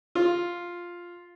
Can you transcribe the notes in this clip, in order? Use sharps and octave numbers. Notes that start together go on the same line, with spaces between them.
F4